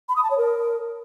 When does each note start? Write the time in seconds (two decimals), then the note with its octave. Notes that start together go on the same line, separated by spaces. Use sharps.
0.09 B5
0.16 D#6
0.23 A5
0.31 C#5
0.38 A#4